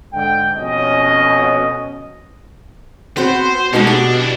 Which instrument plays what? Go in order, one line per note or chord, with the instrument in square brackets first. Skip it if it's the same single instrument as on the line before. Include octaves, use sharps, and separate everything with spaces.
[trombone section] G#2 D3 [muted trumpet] G5
[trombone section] F2 B2 C#4 [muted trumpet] D#5
[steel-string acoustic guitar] B3 C4 F#4 [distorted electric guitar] C5
[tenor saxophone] B2 [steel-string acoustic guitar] G#3 D#4 A5 [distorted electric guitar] A#3 C#4
[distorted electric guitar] D4 [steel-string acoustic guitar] G4
[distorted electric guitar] D4 E4